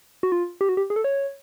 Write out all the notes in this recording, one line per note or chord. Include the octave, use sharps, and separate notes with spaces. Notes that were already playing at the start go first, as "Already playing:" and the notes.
F#4
F4
G4
F#4
G4
G#4
A4
C#5